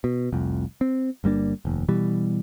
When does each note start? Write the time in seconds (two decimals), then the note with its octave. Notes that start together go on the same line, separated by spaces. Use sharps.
0.04 B2
0.33 F1 C2 F2
0.81 C4
1.24 G1 G3 A#3 D4
1.65 F1 D#2
1.89 B2 E3 G3